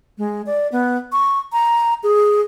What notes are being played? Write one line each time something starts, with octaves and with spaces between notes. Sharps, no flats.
G#3
D5
B3
C#6
A#5
G#4